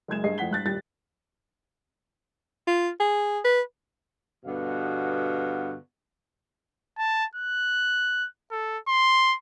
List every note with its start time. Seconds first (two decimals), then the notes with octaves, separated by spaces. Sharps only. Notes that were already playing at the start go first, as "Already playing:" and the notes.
0.08 F#1 G#3 G#6 E7
0.24 G2 G#4 D#5 C7
0.38 F2 A3 F#5 B6 G7
0.51 G2 F#6 A6
0.66 D#1 G3 A6
2.67 F4
3.00 G#4
3.45 B4
4.45 G2 B2 D3 B3 F#4 F5
6.98 A5
7.35 F#6
8.51 A4
8.88 C6